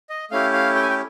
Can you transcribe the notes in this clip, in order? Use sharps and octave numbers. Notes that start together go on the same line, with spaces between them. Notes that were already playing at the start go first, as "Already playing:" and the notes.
D#5
A3 C#4 E4 G4 F5
F5
G5
G#5
G5